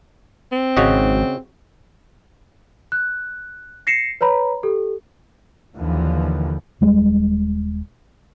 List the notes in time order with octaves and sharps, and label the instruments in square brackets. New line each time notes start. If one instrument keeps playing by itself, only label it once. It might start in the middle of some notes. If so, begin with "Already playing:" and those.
[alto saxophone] C4
[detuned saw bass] G#1 [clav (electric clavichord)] C#3 F#4 D#5
[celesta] F#6
A#6 C7 C#7 E7
B4 C#5 A#5 B5
G4 A4
[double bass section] D#2 D3 E3 F3
[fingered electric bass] D#1 G3 G#3